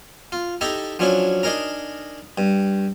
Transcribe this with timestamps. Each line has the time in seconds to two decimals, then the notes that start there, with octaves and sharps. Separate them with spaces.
0.32 F4
0.61 D#4 E4 G4 A4 A#5
0.99 F3 F#3 C#4 D4 E4
1.43 D4 D#4 G#4 A#4 A#5
2.38 G2